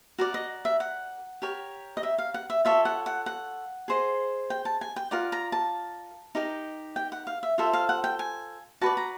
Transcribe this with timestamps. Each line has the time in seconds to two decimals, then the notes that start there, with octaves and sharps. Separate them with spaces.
0.19 F#4 A#4 D5
0.34 D#5
0.65 E5
0.80 F#5
1.42 G4 A#4 C#5
1.97 D#5
2.03 E5
2.18 F5
2.34 F#5
2.50 E5
2.65 F4 A4 C#5 E5
2.85 F#5
3.06 F#5
3.26 F#5
3.88 G#4 C5 D#5
4.50 G5
4.65 A5
4.81 G#5
4.96 G5
5.11 F4 A#4 D5 F#5
5.32 A#5
5.52 A5
6.35 D#4 G4 A#4 D#5
6.96 G5
7.12 F#5
7.27 F5
7.43 E5
7.58 F4 A4 C5 E5
7.73 F5
7.89 F#5
8.04 G5
8.19 G#5
8.81 F#4 B4 D5 A5
8.97 A#5